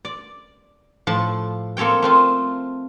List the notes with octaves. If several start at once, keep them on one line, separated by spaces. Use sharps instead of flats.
D5
A2 F3 A5
A#3 C4 A4 C#5 G5
A3 C4 F4